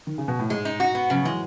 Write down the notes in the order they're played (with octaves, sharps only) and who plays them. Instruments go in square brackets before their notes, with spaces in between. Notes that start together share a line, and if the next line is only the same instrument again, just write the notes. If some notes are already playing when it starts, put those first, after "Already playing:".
[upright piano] D#3
C#3
B2
A2
[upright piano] G#2 [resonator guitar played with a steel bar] G#3
[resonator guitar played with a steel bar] D#4
F#4
B3
[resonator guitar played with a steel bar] C#3 [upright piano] F#3
[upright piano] E3 [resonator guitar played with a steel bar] G#3